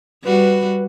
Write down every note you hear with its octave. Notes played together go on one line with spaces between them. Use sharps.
G3 F#4 B4